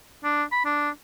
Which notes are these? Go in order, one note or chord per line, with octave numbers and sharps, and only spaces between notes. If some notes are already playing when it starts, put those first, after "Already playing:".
D4
B5
D4